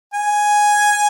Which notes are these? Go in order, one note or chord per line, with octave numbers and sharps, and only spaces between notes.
G#5